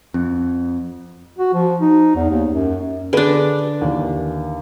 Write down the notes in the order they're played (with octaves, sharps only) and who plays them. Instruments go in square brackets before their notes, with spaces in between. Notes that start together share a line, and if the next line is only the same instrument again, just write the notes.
[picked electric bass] F2 [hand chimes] C4
[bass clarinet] F#4
F3
D#4
E2
D#2
F#2
[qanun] D3 D4 [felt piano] G#4 B4
[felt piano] D#2 E3